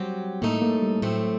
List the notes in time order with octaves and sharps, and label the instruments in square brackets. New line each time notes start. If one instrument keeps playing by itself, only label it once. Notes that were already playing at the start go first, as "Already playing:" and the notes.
Already playing: [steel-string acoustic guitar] F#3 C4 G4 [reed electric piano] G3
[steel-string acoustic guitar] A2 A3 D#4 A4 [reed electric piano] A#3
[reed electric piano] A#3
G3
[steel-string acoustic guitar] A2 A3 C4 [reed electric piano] F#3